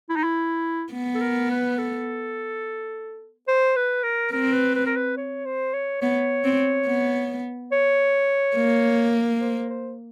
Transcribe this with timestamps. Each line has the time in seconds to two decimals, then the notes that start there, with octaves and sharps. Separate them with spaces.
0.10 E4
0.16 D#4
0.24 E4
0.93 B3
1.15 A4
1.22 A#4
1.51 B4
1.79 A4
3.48 C5
3.76 B4
4.04 A#4
4.32 C4 A#4
4.53 B4
4.75 B4
4.86 A#4
4.96 B4
5.18 C#5
5.46 C5
5.74 C#5
6.02 B3 C#5
6.44 C4
6.87 B3
7.72 C#5
8.56 A#3
9.41 C5
9.70 C5